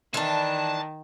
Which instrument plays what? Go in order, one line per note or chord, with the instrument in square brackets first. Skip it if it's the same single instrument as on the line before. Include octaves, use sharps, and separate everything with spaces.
[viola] D#3 [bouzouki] E3 D4 [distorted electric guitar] A5